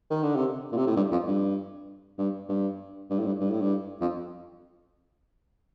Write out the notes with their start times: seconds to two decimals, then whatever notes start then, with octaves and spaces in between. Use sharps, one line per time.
0.10 D#3
0.23 D3
0.36 C3
0.72 A#2
0.77 C3
0.86 A2
0.96 G2
1.12 F2
1.28 G2
2.18 G2
2.49 G2
3.10 G2
3.19 A2
3.26 G2
3.40 G2
3.50 A2
3.61 G2
4.01 F2